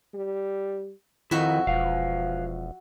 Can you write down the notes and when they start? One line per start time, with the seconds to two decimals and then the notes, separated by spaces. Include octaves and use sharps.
0.14 G3
1.31 F2 D#3 E4 F#4 D#5 E5
1.67 E1 F3 B4 F5